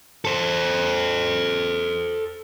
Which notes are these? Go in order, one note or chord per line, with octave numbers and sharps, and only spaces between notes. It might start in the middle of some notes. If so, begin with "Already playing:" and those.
A4 C5